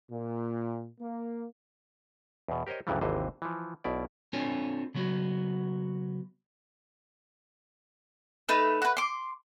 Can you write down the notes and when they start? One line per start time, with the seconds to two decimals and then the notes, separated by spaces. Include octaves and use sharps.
0.12 A#2
1.00 A#3
2.48 E2 B2
2.67 G4 A#4 C5 C#5 D#5
2.87 D2 G2 C#3 E3 F#3 G3
3.01 G#1 D#2 C3 E3 C5 D#5
3.42 E3 F3
3.84 B1 B2 E4 D5
4.33 C4 D4 F4 A4 C#5 G#5
4.94 C#3 F#3 B3 F#4
8.49 A3 D#4 B4 E6
8.82 F#4 B4
8.97 C6 D6